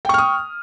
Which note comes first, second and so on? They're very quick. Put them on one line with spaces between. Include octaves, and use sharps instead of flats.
G5 C#6 F6 D#6